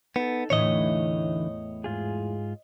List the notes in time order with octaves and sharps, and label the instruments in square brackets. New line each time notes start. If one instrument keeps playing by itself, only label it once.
[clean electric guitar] B3 [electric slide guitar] D#4 A4
[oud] E2 A2 [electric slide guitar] D3 E3 D#4 [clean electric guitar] C#5 D#5
[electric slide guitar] G#2 F4 G#4